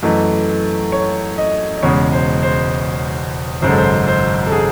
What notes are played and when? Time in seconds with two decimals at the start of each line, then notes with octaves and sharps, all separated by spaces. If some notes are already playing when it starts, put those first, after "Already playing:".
0.03 F#2 E3 A3 D#5
0.92 C#5
1.38 D#5
1.78 D#5
1.83 E1 E2 C#3 G#3 C#5
2.13 C5
2.43 C5
3.62 G#1 F#2 C#3 G#3 C5
3.69 A4
3.78 C5
4.07 C5
4.46 A4
4.52 G#4